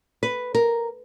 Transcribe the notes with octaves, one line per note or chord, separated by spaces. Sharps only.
B4
A#4